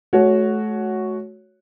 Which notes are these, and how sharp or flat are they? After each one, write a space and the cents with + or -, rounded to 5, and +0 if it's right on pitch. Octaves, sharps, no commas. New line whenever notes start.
A3 -35 F#4 +0 C#5 +5